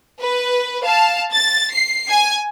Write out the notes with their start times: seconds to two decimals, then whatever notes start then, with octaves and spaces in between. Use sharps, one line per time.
0.21 B4
0.85 F5 A5
1.33 A6
1.73 C7
2.09 G#5